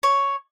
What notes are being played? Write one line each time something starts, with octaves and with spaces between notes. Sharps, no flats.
C#5